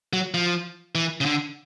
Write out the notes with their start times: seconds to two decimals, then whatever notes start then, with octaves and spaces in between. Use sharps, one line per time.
0.13 F#3
0.34 F3
0.95 E3
1.21 C#3
1.25 D3